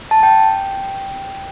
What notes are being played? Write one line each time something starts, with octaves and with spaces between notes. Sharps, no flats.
A5
G5